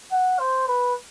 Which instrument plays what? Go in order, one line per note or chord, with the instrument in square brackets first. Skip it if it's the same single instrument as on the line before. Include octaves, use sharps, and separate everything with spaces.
[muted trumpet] F#5
C5
B4